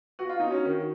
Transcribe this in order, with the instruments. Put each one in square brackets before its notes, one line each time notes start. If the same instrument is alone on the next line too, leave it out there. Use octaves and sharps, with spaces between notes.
[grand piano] F#4
F4
D#4
[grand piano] C#4 [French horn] F#4
[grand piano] D#3